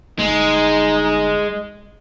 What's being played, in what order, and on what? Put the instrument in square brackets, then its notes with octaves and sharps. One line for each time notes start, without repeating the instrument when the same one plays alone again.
[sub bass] G1 [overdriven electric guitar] G#3 [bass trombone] D#4